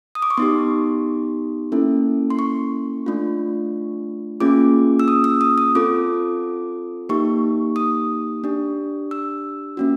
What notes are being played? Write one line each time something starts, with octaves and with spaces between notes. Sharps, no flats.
D#6
D6
C#6
B3 D#4 G4 C6
A#3 C#4 E4 A4
C6
C#6
A3 D4 F4
A#3 C#4 F4 G#4 D6
E6
D#6
E6
D#6
D#6
C4 F4 A4 D6
A#3 D#4 G4 C#6
D#6
D4 G4
E6
A#3 C#4 F#4